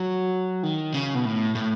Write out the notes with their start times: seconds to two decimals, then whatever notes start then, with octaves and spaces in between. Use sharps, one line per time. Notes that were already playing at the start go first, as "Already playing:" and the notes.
Already playing: F#3
0.63 D#3
0.94 C#3
1.15 B2
1.25 A2
1.55 A2